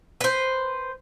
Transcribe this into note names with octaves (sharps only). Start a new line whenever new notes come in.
B4 C5